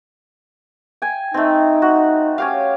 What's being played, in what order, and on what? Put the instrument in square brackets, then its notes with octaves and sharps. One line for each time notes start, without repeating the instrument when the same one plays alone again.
[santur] G5 G#5
[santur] A3 C4 [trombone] D#4
[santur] F#4
C#4 G4 F5